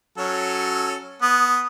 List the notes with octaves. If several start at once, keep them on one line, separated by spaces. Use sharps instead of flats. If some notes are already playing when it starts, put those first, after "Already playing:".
F#3 C#4 A4
B3 D#6